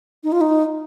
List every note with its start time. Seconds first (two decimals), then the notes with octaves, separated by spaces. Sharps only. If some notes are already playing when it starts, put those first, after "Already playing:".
0.24 D#4
0.32 F4
0.41 D#4